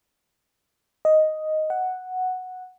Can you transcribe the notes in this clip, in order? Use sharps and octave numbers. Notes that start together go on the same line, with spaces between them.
D#5
F#5